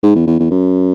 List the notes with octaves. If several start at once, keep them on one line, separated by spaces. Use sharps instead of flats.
G#2
E2
E2
E2
F#2